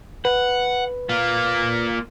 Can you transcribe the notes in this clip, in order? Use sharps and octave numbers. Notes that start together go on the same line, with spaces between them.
B4 F#5
A#3 F4